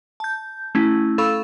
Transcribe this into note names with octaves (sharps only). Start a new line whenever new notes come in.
A5 G6
A3 C#4 E4
A4 F5 B5 C#6 E6